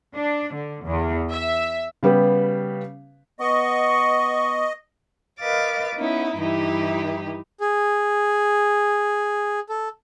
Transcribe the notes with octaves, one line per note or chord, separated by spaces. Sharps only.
D4
D3
E2
E5
C#3 G3 B3 G4 B4
B3 D#5 C#6
A#4 B4 D#5 F5 D6 A6
B3 C#4 D#4 E4
G2 E3 D#4 E4 G4
G#4
A4